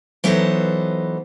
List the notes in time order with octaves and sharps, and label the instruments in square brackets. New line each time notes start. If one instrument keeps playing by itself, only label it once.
[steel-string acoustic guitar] E3 F#3 B3 D#4 A4 C5